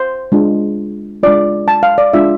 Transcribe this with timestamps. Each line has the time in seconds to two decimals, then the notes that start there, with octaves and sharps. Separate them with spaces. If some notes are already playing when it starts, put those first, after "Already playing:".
Already playing: C5
0.32 G#3 D4 F4
1.23 G#3 D4 F4 D5
1.68 A5
1.83 F5
1.98 D5
2.13 G#3 D4 F4 E5